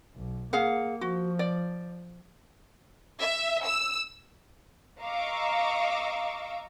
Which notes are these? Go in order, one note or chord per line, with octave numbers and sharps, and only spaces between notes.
B1
A#3 G#4 F5 F#5
F3 F#4
D5
E5
E6
D#5 F5 A#5 C#6 D6 E6